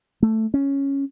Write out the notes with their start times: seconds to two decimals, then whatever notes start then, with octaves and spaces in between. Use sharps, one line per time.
0.23 A3
0.54 C#4